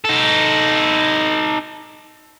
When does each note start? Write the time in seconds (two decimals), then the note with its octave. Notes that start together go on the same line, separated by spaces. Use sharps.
0.05 D#4 A4